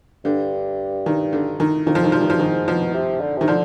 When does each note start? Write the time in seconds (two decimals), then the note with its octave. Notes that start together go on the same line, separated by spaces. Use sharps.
0.25 G2 D3
1.06 D#3
1.33 D3
1.60 D#3
1.86 F2 D#3
1.95 F3
2.04 D#3
2.12 G2 F3
2.21 D#3
2.30 F3
2.40 G#2 D#3
2.67 B2 F3
2.94 C3
3.21 D3
3.38 C3 D#3
3.48 D3 F3